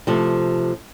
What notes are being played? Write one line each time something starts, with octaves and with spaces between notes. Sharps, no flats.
C3 F3 A3